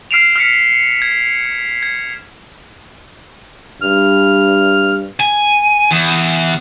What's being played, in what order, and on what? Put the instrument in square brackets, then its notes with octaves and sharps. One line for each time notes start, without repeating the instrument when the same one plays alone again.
[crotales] F6 C7 D7 E7 F7
F6 B6 C#7
G#6
G#6
[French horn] G2 [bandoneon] F6
[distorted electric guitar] G#5
E2